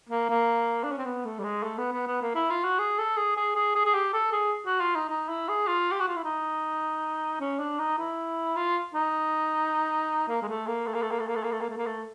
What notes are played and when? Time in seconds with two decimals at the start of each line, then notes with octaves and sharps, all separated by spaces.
0.09 A#3
0.29 A#3
0.84 D4
0.91 C#4
0.98 C4
1.05 B3
1.25 A3
1.40 G3
1.44 G#3
1.63 A3
1.78 B3
1.93 B3
2.07 B3
2.21 A#3
2.35 E4
2.50 F4
2.64 F#4
2.79 G#4
2.98 A4
3.17 G#4
3.37 G#4
3.56 G#4
3.75 G#4
3.85 G#4
3.94 G4
4.13 A4
4.32 G#4
4.66 F#4
4.80 F4
4.95 D#4
5.09 D#4
5.29 E4
5.49 G#4
5.67 F4
5.91 G4
6.00 F#4
6.08 F4
6.16 E4
6.24 D#4
7.40 C#4
7.59 D4
7.79 D#4
7.98 E4
8.56 F4
8.94 D#4
10.28 A#3
10.42 G#3
10.48 A3
10.67 A#3
10.87 A3
10.94 A#3
11.03 A3
11.11 A#3
11.20 A3
11.28 A#3
11.36 A3
11.44 A#3
11.52 A3
11.61 A#3
11.69 A3
11.77 A#3
11.86 A3